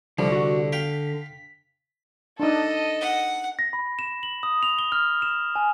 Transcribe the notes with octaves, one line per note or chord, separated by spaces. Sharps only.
C2 D3 F3 G3
F#4
F5 G5 B6
D4 D#4 A4 D#5
F#5
A#6
B5
E7
F#7
D#6
F7
G7
F6
E7
G#5